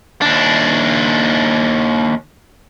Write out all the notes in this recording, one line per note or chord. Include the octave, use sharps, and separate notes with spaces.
D#2 D4